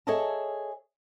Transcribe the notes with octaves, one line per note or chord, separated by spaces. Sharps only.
G#4 A4 C#5 D#5 E5 A5